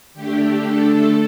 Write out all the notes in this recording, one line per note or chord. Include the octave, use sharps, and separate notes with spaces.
D3 A3 D4 G4
A4